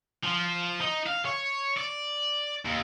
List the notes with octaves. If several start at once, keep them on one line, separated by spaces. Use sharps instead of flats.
F3
D#4
F5
C#5
D5
D#2